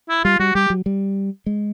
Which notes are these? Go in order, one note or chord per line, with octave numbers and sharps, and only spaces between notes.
E4
G3 F4
G3 F#4
G3 G4
F#3
G3
G#3